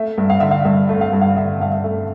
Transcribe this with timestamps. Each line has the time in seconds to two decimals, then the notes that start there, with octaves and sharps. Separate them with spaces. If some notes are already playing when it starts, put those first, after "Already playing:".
Already playing: A3 E5
0.18 G2
0.30 F5
0.40 D3 E5
0.51 F5
0.65 G2 E5
0.89 A3
1.01 F5
1.13 G2
1.21 F5
1.37 D3 E5
1.60 G2 F5
1.72 E5
1.84 A3